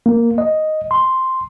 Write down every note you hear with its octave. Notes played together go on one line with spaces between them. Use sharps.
A#3
D#5
C6